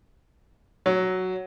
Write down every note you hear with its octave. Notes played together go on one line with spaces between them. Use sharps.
F#3